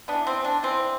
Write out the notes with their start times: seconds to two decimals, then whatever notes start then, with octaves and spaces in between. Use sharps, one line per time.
0.08 E3 B3 D4
0.27 C4
0.45 D4
0.63 E3 B3 C4